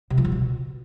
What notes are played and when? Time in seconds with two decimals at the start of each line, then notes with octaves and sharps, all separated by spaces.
0.10 C3
0.18 F3
0.25 C#3
0.32 B2